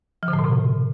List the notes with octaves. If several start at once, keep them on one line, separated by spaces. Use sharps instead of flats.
F3
D3
A2
B2
C3